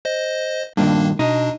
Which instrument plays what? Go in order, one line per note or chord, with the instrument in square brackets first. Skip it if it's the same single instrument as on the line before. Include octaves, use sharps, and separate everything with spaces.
[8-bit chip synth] C5 D#5
[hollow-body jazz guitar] G2 A#2 D#3 [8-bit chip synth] A#3 D4
[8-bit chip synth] B2 D4 [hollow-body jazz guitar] D#4